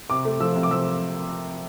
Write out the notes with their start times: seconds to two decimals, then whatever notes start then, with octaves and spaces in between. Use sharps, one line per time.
0.10 C3 D6
0.25 A3
0.40 F3 E6
0.55 C3
0.63 D6
0.71 F3 E6